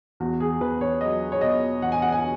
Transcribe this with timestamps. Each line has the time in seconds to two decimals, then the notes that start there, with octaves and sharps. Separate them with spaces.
0.20 E2 F#4
0.40 G#4
0.61 E2 B4
0.81 C#5
1.01 F#3 D#5
1.32 C#5
1.41 B2 D#5
1.82 E2 F#5
1.92 G#5
2.02 F#5
2.12 G#5